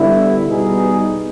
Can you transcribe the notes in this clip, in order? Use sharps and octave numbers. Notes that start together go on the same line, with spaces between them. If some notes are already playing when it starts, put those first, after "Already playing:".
Already playing: D3 G3 B3 E4
B2 G3 B3 D#4 G#4